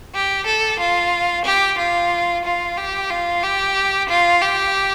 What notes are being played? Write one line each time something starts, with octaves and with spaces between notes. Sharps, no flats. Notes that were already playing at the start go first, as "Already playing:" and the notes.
G4
A4
F4
G4
F4
F4
G4
F4
G4
F4
G4